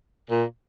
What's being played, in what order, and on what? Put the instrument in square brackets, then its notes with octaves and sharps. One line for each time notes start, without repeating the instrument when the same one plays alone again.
[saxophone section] A#2